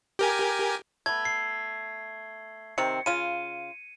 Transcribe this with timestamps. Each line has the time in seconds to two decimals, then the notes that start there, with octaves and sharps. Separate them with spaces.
0.19 G4 A#4 G#5
1.06 A3 B3 G#6
1.25 C7
2.78 C3 D#3 C4 C#7
3.06 C#3 F4 D#7